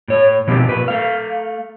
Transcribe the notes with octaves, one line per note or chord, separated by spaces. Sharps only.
A2 C#5
B2 F3 C4 G4
A#2 B4
A3 F5